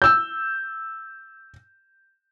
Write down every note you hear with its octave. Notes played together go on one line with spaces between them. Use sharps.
E6 G6